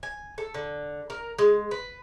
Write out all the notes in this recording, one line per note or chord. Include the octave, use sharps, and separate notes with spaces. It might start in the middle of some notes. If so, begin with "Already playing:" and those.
G#5
A4
D3
A#4
G#3
B4